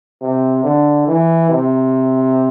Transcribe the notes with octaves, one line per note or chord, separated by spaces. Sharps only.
C3
D3
E3
C3